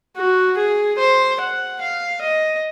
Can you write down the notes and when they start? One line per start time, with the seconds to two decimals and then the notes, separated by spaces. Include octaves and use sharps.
0.17 F#4
0.58 G#4
0.99 C5
1.40 F#5
1.81 F5
2.21 D#5